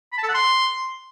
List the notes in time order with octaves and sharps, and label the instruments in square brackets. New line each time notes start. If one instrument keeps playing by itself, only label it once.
[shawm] B5
A5
A4
F#5
C6